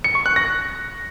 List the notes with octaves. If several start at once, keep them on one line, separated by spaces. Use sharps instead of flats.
C#7
C#6
F#6
A#6